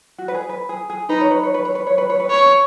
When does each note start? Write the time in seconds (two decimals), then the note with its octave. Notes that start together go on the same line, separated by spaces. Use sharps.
0.18 F#4
0.28 B4
0.34 G#4
0.49 B4
0.69 G#4
0.90 G#4
1.09 D#4 B4
1.21 C#5
1.31 B4
1.43 C#5
1.54 B4
1.65 C#5
1.75 B4
1.87 C#5
1.98 B4
2.10 C#5
2.20 B4
2.30 C#5